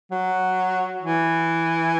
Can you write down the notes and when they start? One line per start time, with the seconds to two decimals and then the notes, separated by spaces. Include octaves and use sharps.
0.12 F#3
1.02 E3